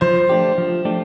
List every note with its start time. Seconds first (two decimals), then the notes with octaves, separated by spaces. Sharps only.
0.01 F3 C5
0.29 A3 D4 G4
0.58 F3
0.85 A3 D4 G4